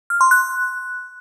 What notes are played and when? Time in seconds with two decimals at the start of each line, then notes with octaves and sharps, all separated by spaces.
0.10 F6
0.21 C6
0.31 F#6